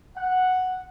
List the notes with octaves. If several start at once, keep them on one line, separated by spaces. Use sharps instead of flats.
F#5